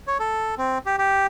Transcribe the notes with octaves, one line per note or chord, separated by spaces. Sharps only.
C#5
A4
C4
G4
G4